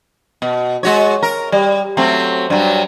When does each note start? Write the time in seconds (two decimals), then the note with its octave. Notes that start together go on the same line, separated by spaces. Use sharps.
0.42 B2
0.83 G#3 F#4 C#5
1.23 A#4
1.52 G3
1.97 F#3 A3 C4
2.50 G2 F#3